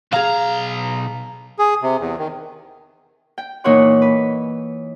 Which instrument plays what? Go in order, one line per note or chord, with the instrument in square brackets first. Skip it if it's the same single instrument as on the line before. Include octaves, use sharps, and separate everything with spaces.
[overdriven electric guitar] B1 A#5 [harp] G#4 F5
[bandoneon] G#4
C3
E2
D#3
[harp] G5
A#2 E3 D#4 C#5 F#5 C6
B4